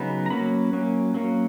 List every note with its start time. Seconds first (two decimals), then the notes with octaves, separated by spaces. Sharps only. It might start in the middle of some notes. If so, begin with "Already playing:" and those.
Already playing: C#3 F#3 B3 D#4 B5
0.26 A#5
0.30 F#3 A#3 C#4 B5
0.73 F#3 A#3 C#4
1.14 F#3 A#3 C#4